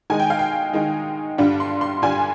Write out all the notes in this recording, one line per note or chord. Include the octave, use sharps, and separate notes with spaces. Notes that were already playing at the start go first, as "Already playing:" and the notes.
D#3 G#3 D#4 G#5
G5
F5
G5
D#3 G#3 D#4
G2 D3 G3 D4 F4
C6
C6
G2 D3 G3 D4 F4 G#5